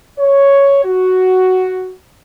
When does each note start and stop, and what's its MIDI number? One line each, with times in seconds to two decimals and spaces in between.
0.19 0.82 73
0.85 1.93 66